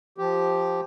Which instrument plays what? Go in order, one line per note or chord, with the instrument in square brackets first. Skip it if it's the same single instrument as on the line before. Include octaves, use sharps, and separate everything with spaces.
[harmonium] F3 G4